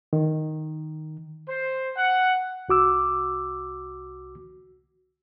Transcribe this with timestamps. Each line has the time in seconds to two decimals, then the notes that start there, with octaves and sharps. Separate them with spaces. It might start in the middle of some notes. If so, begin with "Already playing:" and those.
0.13 D#3
1.49 C5
1.97 F#5
2.69 C2 F#4 D6 E6